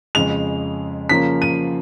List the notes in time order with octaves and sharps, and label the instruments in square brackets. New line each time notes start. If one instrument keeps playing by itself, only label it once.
[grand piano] F2 C#3 G#3 F7
C#3 F3 A#3 C#4 B6
D#7